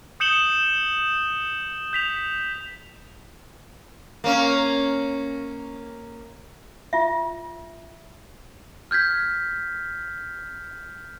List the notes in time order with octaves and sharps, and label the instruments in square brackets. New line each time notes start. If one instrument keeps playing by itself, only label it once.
[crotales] D#6 G6 C#7 E7 F#7 G7
G6 B6 F7
[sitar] A#3 C#4
[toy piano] F4 E5
[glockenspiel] F6 G6 G#6 B6